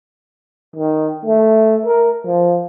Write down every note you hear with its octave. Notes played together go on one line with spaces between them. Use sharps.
D#3
A3
A#4
F3